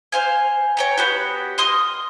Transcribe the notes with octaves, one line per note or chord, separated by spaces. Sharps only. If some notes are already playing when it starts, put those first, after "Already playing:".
C5 F5 G#5
C#5 G5 A#5
B3 F#4 G4
D#5 C6 D#6 F6